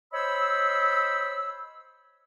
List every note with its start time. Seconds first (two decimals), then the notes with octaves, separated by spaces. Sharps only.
0.14 C5 C#5 D#5 B5 E6